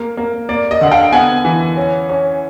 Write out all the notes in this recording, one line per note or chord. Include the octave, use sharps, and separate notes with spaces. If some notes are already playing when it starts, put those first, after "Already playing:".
Already playing: A#3
A#3
A#3 D5
D#5
D3 F#5
F5 G5
B3 F#5 G#5
E3
C#4
C#4